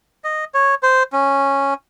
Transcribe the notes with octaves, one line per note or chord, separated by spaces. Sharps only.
D#5
C#5
C5
C#4